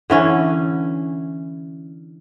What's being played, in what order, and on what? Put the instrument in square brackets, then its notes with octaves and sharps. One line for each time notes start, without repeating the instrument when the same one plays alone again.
[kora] D3 E3 C#4 D4